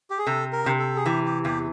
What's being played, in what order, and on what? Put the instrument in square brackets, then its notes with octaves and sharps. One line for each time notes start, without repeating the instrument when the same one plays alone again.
[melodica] G4
G#4
[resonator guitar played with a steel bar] C3 [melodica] A4
[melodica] A#4
[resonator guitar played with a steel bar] C3
[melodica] A4
G#4
[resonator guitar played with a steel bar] E3 [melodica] G4
[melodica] G4
[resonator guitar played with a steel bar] E2 [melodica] G4